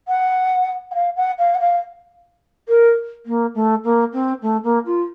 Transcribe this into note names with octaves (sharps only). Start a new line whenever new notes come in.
F#5
F#5
F5
F#5
F5
F#5
F5
A#4
A#3
A3
A#3
C4
A3
A#3
F4